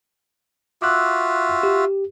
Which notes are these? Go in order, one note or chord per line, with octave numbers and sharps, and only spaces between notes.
F4 F#4 E5 D6 E6 F#6
G4